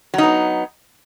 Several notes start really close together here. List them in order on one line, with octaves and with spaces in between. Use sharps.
F#3 D#4 B3